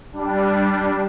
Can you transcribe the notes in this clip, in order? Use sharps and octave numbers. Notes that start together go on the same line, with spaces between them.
G3 D4